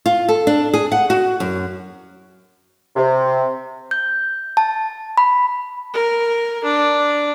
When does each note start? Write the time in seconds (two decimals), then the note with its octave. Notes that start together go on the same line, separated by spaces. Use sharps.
0.06 F4
0.28 A4
0.47 D4
0.74 G#4
0.92 F#5
1.10 F#4
1.40 F#2
2.96 C3
3.91 G6
4.57 A5
5.17 B5
5.93 A#4
6.63 D4